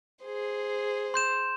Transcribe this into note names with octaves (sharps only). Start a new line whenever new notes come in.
G#4 C5
C6 G6 E7